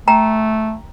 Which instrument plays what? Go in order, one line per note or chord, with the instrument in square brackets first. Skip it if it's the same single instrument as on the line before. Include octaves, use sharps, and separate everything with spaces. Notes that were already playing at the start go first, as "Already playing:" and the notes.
[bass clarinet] A3 [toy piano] G5 A#5